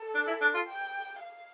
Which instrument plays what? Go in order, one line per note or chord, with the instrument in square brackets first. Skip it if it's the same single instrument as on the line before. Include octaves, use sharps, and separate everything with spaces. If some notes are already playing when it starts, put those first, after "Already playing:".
Already playing: [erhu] A4
[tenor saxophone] D4
E4
D4
F4
[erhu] G5
F5